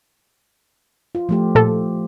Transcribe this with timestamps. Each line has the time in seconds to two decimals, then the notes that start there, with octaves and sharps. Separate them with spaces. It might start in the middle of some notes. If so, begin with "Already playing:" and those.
1.15 F4
1.29 F3 A3 G4
1.55 A#2 A4